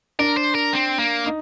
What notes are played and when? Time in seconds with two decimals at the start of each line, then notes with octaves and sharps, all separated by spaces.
0.19 D4 A#4
0.37 C5
0.55 A#4
0.73 C4
0.99 A#3
1.26 D#4